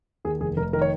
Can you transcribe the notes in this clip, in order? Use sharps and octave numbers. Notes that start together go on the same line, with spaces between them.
D#2 G#4
F1 G#4
F1 A#4
D#3 A#4
C#5